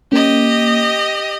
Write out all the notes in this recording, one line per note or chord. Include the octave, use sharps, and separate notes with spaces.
A#3 C#4 G4 D#5